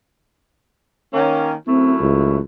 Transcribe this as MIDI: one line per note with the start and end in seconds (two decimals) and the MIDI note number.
1.13 1.53 51
1.13 1.53 58
1.13 1.53 61
1.68 2.38 42
1.68 2.38 57
1.68 1.94 60
1.68 2.38 64
2.01 2.39 37